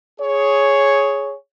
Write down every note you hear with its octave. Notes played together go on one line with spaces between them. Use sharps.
G#4 C#5